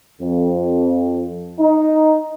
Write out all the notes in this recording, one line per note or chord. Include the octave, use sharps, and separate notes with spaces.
F2
D#4